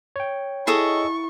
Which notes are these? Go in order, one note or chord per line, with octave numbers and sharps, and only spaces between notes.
C#5 G5
E4 G#4 A4 D#5 C#6